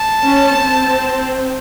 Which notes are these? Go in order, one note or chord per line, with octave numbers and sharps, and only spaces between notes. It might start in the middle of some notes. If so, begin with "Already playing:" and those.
Already playing: A5
C#4
C4